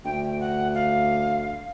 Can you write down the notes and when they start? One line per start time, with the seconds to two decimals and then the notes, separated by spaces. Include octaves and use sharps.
0.05 D2 G5
0.40 F#5
0.74 F5